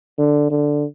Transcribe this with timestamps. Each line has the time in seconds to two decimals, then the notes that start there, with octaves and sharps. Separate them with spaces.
0.18 D3
0.50 D3